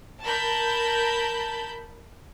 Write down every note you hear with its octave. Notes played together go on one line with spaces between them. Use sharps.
A#4 A5 B5 G6